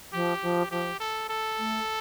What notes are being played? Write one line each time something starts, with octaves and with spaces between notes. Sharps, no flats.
F3 G4
F3
F3 G4
A4
A4
A3